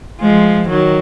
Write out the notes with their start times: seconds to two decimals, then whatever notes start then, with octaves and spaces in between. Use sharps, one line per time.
0.21 F3 G#3
0.69 D#3 F#3